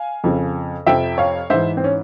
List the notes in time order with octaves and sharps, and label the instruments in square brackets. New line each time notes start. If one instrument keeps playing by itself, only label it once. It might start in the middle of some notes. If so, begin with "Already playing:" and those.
Already playing: [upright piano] F5 G#5
F2 C#3 F3
F2 C3 F3 E5 G5
C#5 F5
G#2 E3 C5 E5
C4
C#4